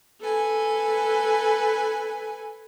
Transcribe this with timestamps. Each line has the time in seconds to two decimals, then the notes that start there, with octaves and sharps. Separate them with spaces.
0.21 A4 B4 G#5